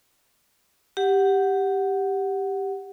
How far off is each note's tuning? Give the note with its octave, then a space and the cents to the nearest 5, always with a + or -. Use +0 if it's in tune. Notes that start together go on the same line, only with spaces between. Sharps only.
G4 +0 F#5 +0